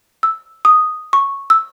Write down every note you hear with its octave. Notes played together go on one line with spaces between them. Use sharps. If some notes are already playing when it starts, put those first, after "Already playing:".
E6
D#6
C#6
E6